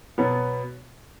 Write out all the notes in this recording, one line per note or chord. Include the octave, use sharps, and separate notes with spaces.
B2 F#3 B3